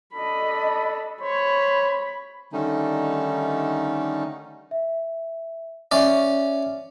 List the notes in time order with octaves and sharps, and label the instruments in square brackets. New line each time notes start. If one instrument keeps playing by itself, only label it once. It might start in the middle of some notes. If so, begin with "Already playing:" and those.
[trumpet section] D4 A4 [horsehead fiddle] D#5 B5
[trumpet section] C5 C#5 [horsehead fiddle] B5
[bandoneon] D3 D#3 G3 A3 C#4 D#4
[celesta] E5
[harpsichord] C#4 D5 [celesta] E5